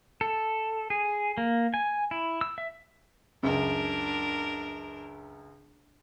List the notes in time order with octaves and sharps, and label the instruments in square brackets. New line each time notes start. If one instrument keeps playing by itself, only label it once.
[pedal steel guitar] A4
G#4
A#3
G#5
E4
E6
E5
[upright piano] C#2 F#2 [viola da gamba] D4 A#4